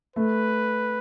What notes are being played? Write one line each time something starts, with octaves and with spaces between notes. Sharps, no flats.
A3 B4